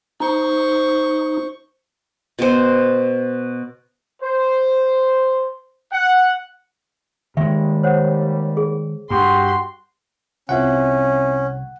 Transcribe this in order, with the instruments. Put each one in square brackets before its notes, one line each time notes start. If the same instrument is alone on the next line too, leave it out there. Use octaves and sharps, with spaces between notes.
[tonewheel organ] D#4 [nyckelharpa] C5 C#6
[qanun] B2 C5
[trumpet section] C5
F#5
[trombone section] D#2 G3 [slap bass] D#3 G#3 [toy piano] E5
[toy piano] C5 C#5 F#5
G#4
[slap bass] G2 [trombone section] F#4 G4 [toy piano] B5 [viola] C6
[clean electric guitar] C2 [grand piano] C4 E4 F4 [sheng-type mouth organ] C#4 [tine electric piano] F#5